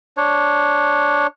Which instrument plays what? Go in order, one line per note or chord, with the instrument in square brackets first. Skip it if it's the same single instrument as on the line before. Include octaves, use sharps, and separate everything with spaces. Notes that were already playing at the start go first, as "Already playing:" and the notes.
[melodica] D4 C#5